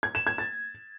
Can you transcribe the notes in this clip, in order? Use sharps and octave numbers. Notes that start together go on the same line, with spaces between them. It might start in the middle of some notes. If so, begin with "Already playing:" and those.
G#6
E7
G#6
A6